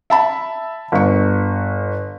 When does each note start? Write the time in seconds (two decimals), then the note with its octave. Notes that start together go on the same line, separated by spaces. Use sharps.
0.10 E5 A5 B5
0.92 G1 C#6